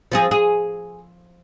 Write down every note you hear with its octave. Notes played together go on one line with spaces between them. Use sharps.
F3 C4 G#4
G#4